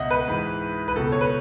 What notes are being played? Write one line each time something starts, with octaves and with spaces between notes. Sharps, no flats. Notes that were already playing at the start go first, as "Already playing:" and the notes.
Already playing: C#2 B2 D#5 E5 F#5
B4
G#2 E3
B4
C#2 B2 A4
C#5
B4